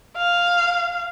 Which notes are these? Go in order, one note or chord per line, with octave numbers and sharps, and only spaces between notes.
F5